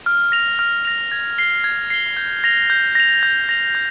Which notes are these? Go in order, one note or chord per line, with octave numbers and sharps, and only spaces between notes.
F6
A#6 F7
F6
A#6 F7
G#6
C7 G7
G#6
C7 G7
G6
A#6 F7
G6
A#6 F7
G6
A#6 F7
G6